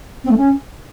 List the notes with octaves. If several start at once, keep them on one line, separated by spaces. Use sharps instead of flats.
C4
A3
C#4